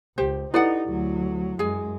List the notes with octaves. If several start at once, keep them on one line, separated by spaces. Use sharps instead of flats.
C#2 G4 C5
D#4 E4 G4 A4 B4 D5 F#5
D2 F#3
F#2 G#3 G#4 G#5